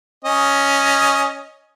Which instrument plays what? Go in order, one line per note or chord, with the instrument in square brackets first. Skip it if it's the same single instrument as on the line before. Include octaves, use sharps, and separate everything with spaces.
[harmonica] C#4 D#5